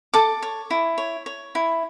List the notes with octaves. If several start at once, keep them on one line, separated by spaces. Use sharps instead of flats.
A4 D6
C#5
E4
C#5
C#5
E4